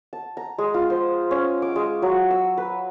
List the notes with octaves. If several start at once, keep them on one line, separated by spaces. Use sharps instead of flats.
A5
A#5
G#3
F4
C5
C#4
D6
G#3
F#3
E6
B4